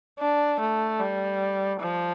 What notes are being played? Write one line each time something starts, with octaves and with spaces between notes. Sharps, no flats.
D4
A3
G3
F3